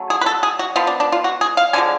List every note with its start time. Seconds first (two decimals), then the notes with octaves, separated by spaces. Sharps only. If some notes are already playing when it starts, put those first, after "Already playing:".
Already playing: C#3 F#3 A3
0.10 G#4
0.21 B4
0.26 A4
0.43 G#4
0.59 F#4
0.76 F3 B3 F4
0.87 D4
1.00 D4
1.12 F4
1.24 F#4
1.41 G#4
1.57 F5
1.73 D3 F3 G#3 G#5